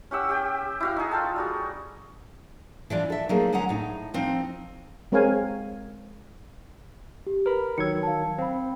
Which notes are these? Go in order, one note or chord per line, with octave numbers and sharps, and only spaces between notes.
C#4 G4 F#5 E6
G4 G5
E4 F#4 F5
D#4 G#4
F4 A4 G5 A5
G3 F#4 G#4
E3 F3 D4
A4 E5
F#3 A3 A#3 D#4 G#4
D2 G#3 C4 C#4 F#5 A#5
A2 A3 D#4
F3 C4 D#4
G#3 C4 A#4 C#5 F5 G#5
G4
A#4 B4 B5
D#3 F#3 E6 G#6 C#7
F5 A5
C4 F5 B5